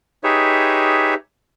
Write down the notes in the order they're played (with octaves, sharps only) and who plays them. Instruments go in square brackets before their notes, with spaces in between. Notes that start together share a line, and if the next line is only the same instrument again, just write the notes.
[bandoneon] D#4 G4 G#4 B4 C#5 E5